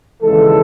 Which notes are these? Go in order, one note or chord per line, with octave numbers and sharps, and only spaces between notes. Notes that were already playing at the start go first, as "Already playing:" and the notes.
D#2 C#3 E3 G#3 A4